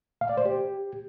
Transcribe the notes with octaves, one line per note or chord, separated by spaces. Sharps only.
F5
D5
C5
G4